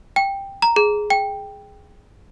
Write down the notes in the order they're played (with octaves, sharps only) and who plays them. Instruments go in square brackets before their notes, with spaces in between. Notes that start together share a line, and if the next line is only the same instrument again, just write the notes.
[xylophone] G5
A#5
G#4
G5